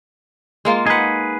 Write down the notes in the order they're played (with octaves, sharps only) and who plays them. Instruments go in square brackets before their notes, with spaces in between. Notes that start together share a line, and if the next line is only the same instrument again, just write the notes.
[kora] G#3 A#3 F4
[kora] D#4 F#5 [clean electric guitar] G#4 B4